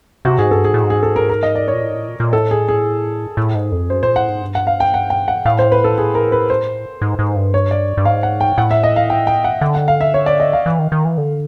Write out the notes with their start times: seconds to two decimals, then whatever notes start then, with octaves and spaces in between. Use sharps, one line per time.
0.25 C3 F#4
0.38 G#2 G#4
0.51 G2 A4
0.64 G#2 G#4
0.74 A2
0.84 G#2
0.90 G#4
1.03 A4
1.16 A#4
1.30 A#4
1.43 D#5
1.55 D5
1.68 C#5
1.73 A#2
1.82 A2
1.90 G#2
1.94 A2
2.07 A#2
2.20 A#2
2.33 A2 A4
2.51 G#4
2.68 G#4
3.37 A2
3.55 G#2
3.72 F2
3.90 F#2 C5
4.02 A#2 C5
4.16 A2 F#5
4.29 G#2
4.41 G2
4.55 F#5
4.67 F5
4.80 G5
4.94 F#5
5.10 G5
5.28 F#5
5.45 A2 F5
5.59 C5
5.72 B4
5.84 A4
5.98 G#4
6.15 A#4
6.32 B4
6.50 C5
7.02 G#2
7.19 G#2
7.36 G2
7.54 C#5
7.71 D5
7.97 G2
8.05 G#2 F5
8.23 F#5
8.41 G5
8.58 A2 F#5
8.71 E5
8.83 D#5
8.96 F5
9.10 G5
9.27 G5
9.44 F#5
9.61 D3 F#5
9.75 F#5
9.88 F5
10.01 E5
10.14 C#5
10.26 D5
10.40 D#5
10.53 F5
10.66 E3
10.79 D#3
10.92 D#3
11.05 E3
11.18 D3